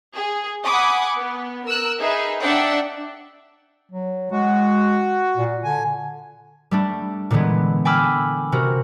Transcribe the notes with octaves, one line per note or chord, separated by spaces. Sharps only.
G#4
F#5 G#5 B5 D6 D#6
B3
A#4 E6 F#6
D#4 G#4 B4 E5
D4 D5 E5 F#5 G5
F#3
G#3 F#4
A#2
D3 G#5
G3 A3 D4
A#2 D3 E3 G#3 B3
G5 G#5 B5 D6 E6 F6
C3 F#4 A#4